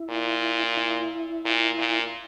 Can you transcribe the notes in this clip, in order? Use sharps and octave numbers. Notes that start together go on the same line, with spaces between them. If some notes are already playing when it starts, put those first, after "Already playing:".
Already playing: E4
A#2
E4
A#2
A#2